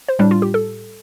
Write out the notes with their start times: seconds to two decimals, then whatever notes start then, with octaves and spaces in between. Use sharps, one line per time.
0.08 C5
0.19 A2 G3 D4
0.31 F4
0.42 G4
0.54 A4